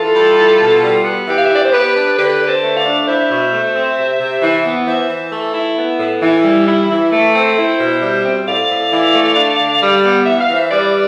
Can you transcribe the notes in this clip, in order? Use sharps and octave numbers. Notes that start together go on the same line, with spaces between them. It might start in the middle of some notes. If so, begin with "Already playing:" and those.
Already playing: E3 F4 A4
G3
E4
B2
G3
B3
E3 G4 B4
F5
E5
E3 D5
C5
B3 G4 B4
D4
D3 G4 B4
D3
A4 C5
A3
D5 F5
D4
E4 C5 E5
B2
A3
C4
C3
C3
E3
B3
E3 C5 E5
E3
A3
E4
B3
A2
E3
G3
E4
E3
A3
C4
E4 C5 E5
B2
G3
C4
A2 D5 F5
A2
E3
A3
D4
D3
G3
B3
E3 E5
F5
E3 C5 E5
G3 B4 D5